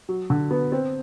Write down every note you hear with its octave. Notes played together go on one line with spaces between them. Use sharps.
F#3
D3
B3
C4